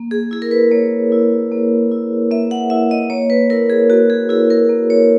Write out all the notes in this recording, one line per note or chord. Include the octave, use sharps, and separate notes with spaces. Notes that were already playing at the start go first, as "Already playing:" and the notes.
Already playing: A#3
G#4
E4 G#4
A#4
B4
A#3 C#5
E4
A#3
E4
A#3 E5
F#5
E4 E5
D#5
A#3 C#5
B4
E4 A#4
G#4
A#3 F#4
G#4
E4 G#4
A#4
A#3
C#5